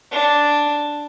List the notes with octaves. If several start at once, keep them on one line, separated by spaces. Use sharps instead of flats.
D4